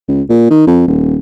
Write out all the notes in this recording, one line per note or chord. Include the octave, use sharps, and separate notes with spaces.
C#2
A#2
D#3
F2
D#1